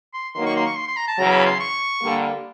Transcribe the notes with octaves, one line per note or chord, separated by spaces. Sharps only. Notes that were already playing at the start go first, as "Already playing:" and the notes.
C6
D#3 F#3 A#3 D#4 C6
C#6
C6
C#6
C6
C6
A#5
A5
E2 C#3 F#3 A#5
B5
C6
C#6
D3 G3 A#3